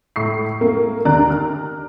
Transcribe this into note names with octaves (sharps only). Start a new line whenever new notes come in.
A2 C#6 C7
A3 A#3
D#2 D4 D5 A#5 F#6
F6